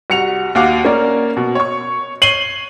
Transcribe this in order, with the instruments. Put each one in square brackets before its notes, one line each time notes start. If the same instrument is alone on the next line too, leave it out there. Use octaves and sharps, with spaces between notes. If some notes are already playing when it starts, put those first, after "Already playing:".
[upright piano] C2 F#4 C#7 F7
D#2 F#4 F5 F#5 D6
A#3 C#4 A#4 D5
B2
C#5 C#6
C#5 C7 D#7 F#7 G7